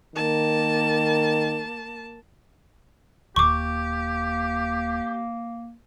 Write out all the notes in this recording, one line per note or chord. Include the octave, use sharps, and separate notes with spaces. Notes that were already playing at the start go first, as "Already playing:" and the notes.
D#3 A#3 A5
D#1 A#3 G4 C#6 D6